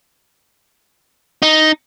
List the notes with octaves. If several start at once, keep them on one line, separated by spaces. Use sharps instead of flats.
D#4